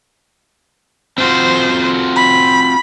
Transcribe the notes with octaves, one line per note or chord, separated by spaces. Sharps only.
C4 F4 F#4 C5
B5